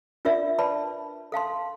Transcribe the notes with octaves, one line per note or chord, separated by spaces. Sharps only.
D4 F4 A#4 D5 E5
B4 D5 A5 B5
A4 F5 A5 C6